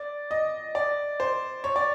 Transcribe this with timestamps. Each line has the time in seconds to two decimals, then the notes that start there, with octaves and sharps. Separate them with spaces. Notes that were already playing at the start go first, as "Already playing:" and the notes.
Already playing: D5
0.31 D#5
0.75 D5
1.20 C5
1.64 C#5
1.76 D5